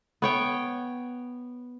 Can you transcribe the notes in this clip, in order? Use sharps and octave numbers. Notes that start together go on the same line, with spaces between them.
B3 C#5 G5